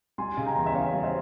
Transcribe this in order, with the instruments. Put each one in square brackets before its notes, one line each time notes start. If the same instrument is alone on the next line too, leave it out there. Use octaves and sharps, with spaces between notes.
[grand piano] G3 [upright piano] G#5 C6
[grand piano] C#3 [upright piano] G#5
[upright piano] G5 A#5
[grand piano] E2
[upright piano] E5
[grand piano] C#4 [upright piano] C#5 F5
[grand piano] G3
[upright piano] C5 E5